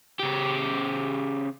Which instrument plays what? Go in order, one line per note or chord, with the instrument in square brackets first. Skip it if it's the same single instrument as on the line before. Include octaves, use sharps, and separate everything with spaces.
[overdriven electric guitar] C#3 G4